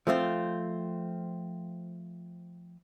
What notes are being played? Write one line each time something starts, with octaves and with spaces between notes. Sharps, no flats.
F3 A3 C4 F4